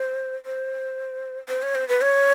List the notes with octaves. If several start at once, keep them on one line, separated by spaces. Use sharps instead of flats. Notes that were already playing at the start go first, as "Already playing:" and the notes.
Already playing: C5
C5
C5
C#5
C5
B4
C#5